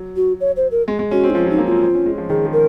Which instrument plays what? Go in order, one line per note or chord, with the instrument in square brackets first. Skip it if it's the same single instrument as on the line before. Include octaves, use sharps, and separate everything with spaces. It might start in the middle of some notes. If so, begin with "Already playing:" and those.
Already playing: [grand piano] F#3
[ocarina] F#4
C#5
C5
A#4
[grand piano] G#3
G#3
[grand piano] C#4 [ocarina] F#4
[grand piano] C4
[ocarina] D#4
[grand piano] F3 [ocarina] F4
[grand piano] F#3
[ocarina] D#4
[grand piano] A#3
[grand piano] C4 [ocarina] F4
[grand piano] C4
C#4
G#3
F3
[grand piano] D#3 [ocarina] G#4
[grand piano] F3
[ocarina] A#4